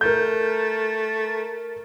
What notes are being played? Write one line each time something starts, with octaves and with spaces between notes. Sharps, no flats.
A3 A#4 G6